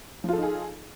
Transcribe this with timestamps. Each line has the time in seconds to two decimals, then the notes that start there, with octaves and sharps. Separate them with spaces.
0.24 F3
0.28 F4
0.33 A4
0.38 D#4
0.43 G#4